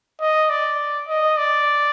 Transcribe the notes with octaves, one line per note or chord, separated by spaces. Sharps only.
D#5
D5
D#5
D5